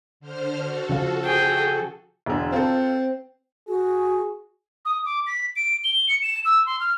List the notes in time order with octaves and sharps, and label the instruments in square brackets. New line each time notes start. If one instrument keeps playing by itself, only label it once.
[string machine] D3 C5 F6
F#4 A4
[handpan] C#3 F3 F5
[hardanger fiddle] G#4 G5
[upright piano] E1 D3
[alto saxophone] C4 [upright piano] F4 A4
[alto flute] F#4 [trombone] G#4
[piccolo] D#6
D6
B6
D7
G7
C#7
E7
E6
C6
F6